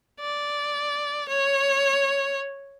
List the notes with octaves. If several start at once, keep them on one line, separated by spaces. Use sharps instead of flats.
D5
C#5